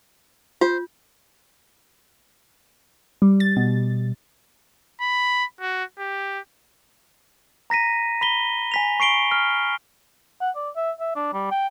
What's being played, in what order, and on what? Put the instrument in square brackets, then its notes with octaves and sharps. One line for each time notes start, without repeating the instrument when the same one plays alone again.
[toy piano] F4 [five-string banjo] C5
[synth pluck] G3
A6
B2
[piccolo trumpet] B5
F#4
G4
[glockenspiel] A#5 A#6 B6 D#7
B5 B6 G7
G#5 B6 F7
C#6 C7 D7 G7
F6
[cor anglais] F#5
D5
E5
E5
D4
G3
G5